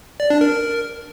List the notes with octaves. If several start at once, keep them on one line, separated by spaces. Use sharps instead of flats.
D5
D4
A#4